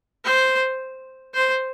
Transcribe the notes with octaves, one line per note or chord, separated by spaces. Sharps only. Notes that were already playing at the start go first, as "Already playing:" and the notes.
C5
C5